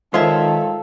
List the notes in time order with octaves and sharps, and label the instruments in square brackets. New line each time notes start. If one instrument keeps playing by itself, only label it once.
[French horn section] D#3 [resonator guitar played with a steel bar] G#3 C#5 E5 [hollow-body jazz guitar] F4 C5 [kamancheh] A4